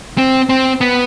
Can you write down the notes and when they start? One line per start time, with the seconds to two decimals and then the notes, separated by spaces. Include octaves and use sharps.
0.18 C4
0.49 C4
0.81 B3